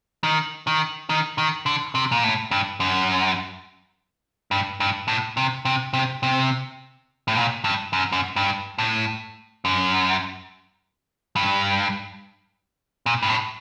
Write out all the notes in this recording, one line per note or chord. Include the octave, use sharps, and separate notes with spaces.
D#3
D#3
D#3
D#3
D3
C3
A#2
A2
G2
F#2
G2
G2
A2
C3
C3
C3
C3
A2
A#2
G2
F#2
F#2
G2
A2
F#2
G2
A#2
G2
A2